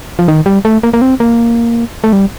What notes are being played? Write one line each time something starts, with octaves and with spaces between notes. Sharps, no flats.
F3
D#3
G3
A3
A#3
A#3
C4
A#3
A3
G3